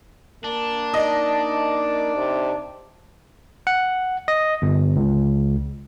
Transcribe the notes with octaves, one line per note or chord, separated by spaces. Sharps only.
A#3 D4
D#4 D5 D#5 A5
C3
F#5
D#5
G1
C#2